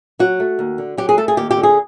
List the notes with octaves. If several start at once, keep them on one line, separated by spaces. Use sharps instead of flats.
F#3 F#4
A3
D#2
D3
F#3 G4
G#4
A3 A4
G#4
D#2 G4
G4
D3
G#4